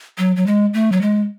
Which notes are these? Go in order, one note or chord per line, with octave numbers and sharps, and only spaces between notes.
F#3
F#3
G#3
A3
F#3
G#3